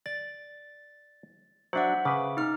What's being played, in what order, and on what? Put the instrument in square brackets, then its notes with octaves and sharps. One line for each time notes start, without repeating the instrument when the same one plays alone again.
[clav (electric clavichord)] D5 [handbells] A6
[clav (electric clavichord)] F#3 D4 [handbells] C5 E5 F#5
[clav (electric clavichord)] C#3 B4 [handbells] D6
[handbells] D#4 F6